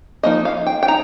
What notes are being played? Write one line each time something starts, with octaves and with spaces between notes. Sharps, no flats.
F3 A#3 D#4 D#5
F5
G5
G5
D#4 A#5